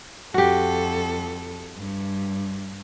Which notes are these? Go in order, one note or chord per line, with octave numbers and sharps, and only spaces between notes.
F2 F#4 G4 A4
G2